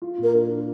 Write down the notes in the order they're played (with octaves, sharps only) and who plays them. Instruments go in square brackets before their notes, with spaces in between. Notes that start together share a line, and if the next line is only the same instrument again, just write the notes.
[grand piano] F4
[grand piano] A#2 [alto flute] A#4
[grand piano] D4
F4